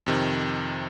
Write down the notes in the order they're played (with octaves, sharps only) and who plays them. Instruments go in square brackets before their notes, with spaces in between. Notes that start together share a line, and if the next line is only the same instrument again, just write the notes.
[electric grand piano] F2 C3 D#3